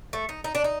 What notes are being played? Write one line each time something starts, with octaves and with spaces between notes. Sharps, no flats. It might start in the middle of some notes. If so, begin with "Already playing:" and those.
A3
D#4
D#4
D4
D#4